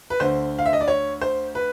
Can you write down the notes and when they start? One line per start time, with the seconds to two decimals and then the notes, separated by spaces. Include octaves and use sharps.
0.10 B4
0.20 D2 D3 C5
0.58 F5
0.66 E5
0.73 D#5
0.81 D5
0.88 C#5
1.21 C5
1.55 B4